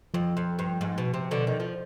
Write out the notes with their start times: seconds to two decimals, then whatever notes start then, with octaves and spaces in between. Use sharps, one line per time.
0.14 F2 F3
0.37 F2
0.59 G2
0.81 G#2
0.98 B2
1.14 C3
1.31 B2 D3
1.47 D#3
1.60 F3